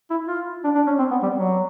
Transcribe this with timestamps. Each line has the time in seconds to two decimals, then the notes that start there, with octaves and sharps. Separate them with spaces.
0.10 E4
0.27 F4
0.64 D4
0.75 D4
0.86 C#4
0.98 C4
1.11 B3
1.22 G3
1.35 F#3